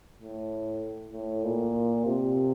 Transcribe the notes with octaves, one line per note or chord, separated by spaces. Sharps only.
A2
A2
A#2
C3